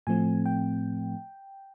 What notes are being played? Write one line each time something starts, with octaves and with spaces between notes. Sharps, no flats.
A2 F3 A3 C4 G#5
G5